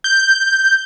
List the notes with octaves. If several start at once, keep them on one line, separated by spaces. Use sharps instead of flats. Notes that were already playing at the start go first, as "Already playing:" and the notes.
G6